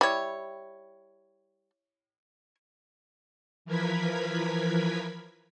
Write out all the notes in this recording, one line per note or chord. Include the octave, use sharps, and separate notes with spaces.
G3 E4 C#5
E3 F3 A#4 B4 G#6 B6